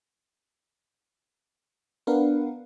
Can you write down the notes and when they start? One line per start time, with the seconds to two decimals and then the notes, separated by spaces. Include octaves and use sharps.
2.07 B3 D4 A#4 B4 F5 F#5